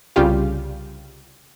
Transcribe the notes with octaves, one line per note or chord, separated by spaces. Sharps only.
C2 C#3 G3 F4 G4 F5